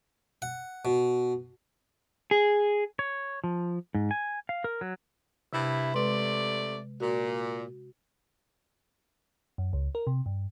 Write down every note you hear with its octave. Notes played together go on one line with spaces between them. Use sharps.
F#5
B2
G#4
C#5
F3
G#2
G#5
F5
A#4
F#3
G2 C3 E4
C3 G#3 A3 B4 D5 C6
A#2 F#4
F#2
C#2
A#4
C3
G2